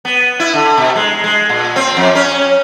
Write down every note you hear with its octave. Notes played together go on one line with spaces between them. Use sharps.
B3
E4
D3
B2
G#3
G#3
A#2
C4
F2
C#4